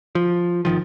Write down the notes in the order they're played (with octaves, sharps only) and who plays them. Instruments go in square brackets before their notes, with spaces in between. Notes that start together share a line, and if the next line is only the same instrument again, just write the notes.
[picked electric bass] F3
G#1 D2 D#3 F3